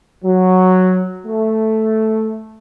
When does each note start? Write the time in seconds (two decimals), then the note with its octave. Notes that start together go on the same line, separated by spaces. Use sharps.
0.25 F#3
1.27 A3